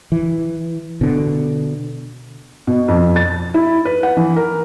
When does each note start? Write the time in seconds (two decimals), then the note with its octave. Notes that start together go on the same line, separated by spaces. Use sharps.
0.12 E3
1.01 B2 D3
2.67 B2
2.88 F2
3.16 A6
3.54 E4
3.85 B4
4.03 F#5
4.17 E3
4.36 A#4